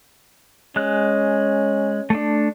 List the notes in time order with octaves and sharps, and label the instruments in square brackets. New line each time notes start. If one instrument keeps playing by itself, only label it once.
[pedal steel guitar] G#3 F#6 [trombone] C#4
[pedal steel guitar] A3 D4